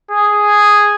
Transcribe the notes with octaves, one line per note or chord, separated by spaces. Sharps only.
G#4